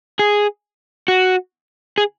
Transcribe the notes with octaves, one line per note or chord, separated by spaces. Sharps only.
G#4
F#4
G#4